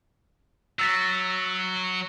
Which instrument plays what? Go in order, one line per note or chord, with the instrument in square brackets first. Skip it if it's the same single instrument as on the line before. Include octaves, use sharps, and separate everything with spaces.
[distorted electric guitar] F#3 [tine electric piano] E6 A6 B6